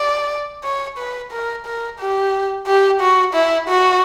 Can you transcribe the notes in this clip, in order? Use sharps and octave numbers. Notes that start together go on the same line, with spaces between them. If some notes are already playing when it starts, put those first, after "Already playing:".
Already playing: D5
C#5
B4
A#4
A#4
G4
G4
F#4
E4
F#4